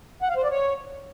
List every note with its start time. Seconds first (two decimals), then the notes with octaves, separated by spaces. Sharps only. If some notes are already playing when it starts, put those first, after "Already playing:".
0.22 F#5
0.29 F5
0.37 C5
0.44 D5
0.51 C#5